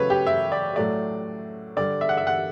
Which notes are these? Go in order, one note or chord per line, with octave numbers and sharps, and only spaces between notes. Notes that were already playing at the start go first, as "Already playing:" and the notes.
Already playing: C#3 F#3 A3 B4 C#5
G4
E5
D5
A2 F#3 A3 D5
D3 G3 D5
E5
F#5
E5
F#5